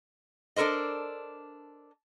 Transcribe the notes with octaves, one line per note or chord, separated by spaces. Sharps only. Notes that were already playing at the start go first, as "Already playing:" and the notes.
D4 A4 A#4 C5 D#5